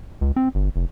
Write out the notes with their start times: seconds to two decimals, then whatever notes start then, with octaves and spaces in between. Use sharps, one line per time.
0.21 C#2
0.36 C4
0.55 G1
0.76 F1